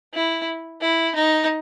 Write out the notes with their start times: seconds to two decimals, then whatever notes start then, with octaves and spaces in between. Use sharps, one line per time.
0.14 E4
0.81 E4
1.15 D#4